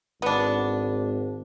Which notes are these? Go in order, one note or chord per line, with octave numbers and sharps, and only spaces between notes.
G#1 B3 D4